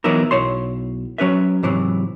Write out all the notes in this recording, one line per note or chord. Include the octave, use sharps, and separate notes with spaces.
E3 F#3 B3 D#4 E4 A#4
B1 E4 C#5 C6
F#3 C#4 B4 E5
G#2 C3 E3 F#3